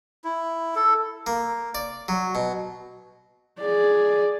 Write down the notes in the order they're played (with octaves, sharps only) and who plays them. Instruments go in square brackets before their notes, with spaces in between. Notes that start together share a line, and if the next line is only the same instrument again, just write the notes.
[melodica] E4
A4
[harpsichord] A#3
D5
F#3
B2
[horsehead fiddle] G#4 D5